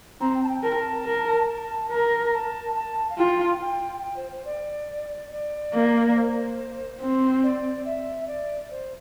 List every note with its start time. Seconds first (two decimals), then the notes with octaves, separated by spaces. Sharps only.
0.21 C4 A#5
0.34 G5
0.43 A5
0.49 G5
0.63 A#4 A5
0.71 G5
0.79 A5
1.05 A#4
1.48 A5
1.90 A#4 A#5
2.34 A5
2.76 A5
3.10 F5
3.18 F4 G5
3.61 G5
4.03 G5
4.17 C5
4.32 C5
4.45 D5
5.31 D5
5.74 A#3
6.16 C5
7.01 C4
7.43 D5
7.85 E5
8.27 D5
8.71 C5